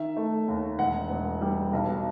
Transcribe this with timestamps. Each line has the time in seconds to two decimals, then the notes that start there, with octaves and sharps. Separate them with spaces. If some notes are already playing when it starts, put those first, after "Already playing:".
Already playing: D#3 E5
0.17 A3
0.48 D#2
0.79 E1 F#5
1.10 E1
1.41 G3
1.73 B1